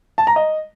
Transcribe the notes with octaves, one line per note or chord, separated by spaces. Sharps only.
A5
A#5
D#5